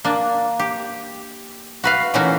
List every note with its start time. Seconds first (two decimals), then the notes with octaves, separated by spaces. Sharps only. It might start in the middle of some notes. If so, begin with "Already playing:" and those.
0.05 A#3 D4
0.59 G4
1.84 F#4 B4 F5
2.14 A#2 E3 A3 C#4 D#4 F#4